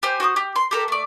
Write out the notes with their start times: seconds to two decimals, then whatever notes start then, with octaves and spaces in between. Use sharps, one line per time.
0.03 G4 C5 G#5
0.20 F#4 C5 C#6 D#6
0.36 G4
0.56 C6
0.71 G4 A4 A#4
0.88 A3 D5